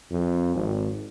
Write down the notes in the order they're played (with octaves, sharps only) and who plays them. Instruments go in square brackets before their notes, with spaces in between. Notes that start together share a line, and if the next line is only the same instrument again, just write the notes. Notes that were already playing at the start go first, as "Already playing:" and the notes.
[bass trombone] F2
G#1